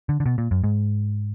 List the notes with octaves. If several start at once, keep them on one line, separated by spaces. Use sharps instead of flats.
D3
D3
B2
A#2
F#2
G#2